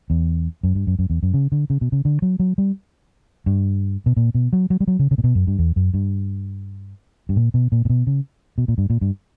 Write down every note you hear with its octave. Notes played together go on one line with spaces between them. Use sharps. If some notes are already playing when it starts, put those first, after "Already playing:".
E2
F#2
G2
F#2
F#2
E2
F#2
C#3
D3
C#3
B2
C#3
D3
F#3
F#3
G3
G2
B2
A#2
B2
F#3
F#3
G3
F#3
C#3
C#3
A#2
B2
F#2
G2
E2
F#2
G2
G2
A#2
B2
A#2
A#2
B2
C#3
B2
A#2
G2
A#2
G2